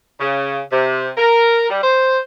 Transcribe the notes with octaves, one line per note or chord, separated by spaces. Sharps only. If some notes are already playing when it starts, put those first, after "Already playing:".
C#3
C3
A#4
G3
C5